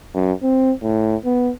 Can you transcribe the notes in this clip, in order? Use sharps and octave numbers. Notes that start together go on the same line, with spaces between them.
F#2
C4
A2
B3